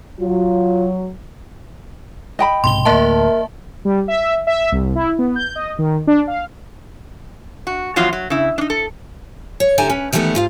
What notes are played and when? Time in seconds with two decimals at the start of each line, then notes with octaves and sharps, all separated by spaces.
0.20 F#3 F4
2.39 D#5 G5 B5
2.64 B1 G#2 C3 C6 G7
2.85 D2 A2 A#3 A#4 E5 A5
3.85 G3
4.08 E5
4.47 E5
4.72 C2
4.95 E4
5.19 B3
5.36 G6
5.55 D#5
5.79 D#3
6.07 D4
6.28 F5
7.67 F#4
7.96 E2 F3 F#3 F4 F5
8.13 F#3
8.30 C#3 E4
8.58 D4 D#4
8.70 A4
9.60 C#5
9.78 D3 E4 G4 G#5 A#5
9.90 C#4 B4
10.13 D#3 E3 G3 A3 B3 E4
10.35 G#2 F4 F5